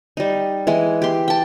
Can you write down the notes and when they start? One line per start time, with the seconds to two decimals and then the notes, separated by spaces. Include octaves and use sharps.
0.17 G3 D#4
0.67 E3 G#3
1.02 G4 C6
1.28 G5 A5